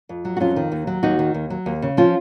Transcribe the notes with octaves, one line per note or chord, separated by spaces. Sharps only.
F2
F#3
F#4
F2 C#4 F4
D#3
D#2
F#3
D#2 D#4 F#4
D#3
D#2
F#3
D#2
C#3
F3 C#4 F4